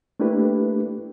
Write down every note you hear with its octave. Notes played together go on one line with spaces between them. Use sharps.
A3 A#3 D4 E4 G4 B4